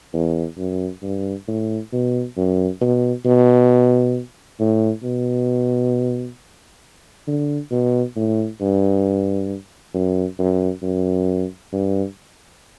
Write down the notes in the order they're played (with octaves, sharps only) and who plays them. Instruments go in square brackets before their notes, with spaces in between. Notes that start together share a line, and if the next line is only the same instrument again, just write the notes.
[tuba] E2
F#2
G2
A2
B2
F#2
B2
B2
A2
B2
D3
B2
A2
G2
F#2
F#2
F#2
G2